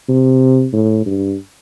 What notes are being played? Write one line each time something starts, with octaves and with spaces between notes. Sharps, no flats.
C3
A2
G2